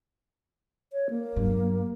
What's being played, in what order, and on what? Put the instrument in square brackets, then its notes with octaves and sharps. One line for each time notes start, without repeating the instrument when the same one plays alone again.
[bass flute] C#5
A#3
[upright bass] G2 F#3